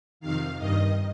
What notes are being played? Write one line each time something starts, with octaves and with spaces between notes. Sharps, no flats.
F2 C3 D#3 F5
G2 D#3 D#5